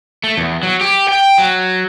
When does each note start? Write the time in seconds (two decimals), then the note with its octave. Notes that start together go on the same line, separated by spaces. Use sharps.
0.24 A3
0.37 E2
0.63 F#3
0.81 G4
1.09 G5
1.38 F#3